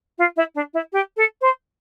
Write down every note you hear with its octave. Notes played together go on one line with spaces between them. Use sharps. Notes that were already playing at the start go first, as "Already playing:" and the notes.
F4
E4
D4
E4
G4
A4
C5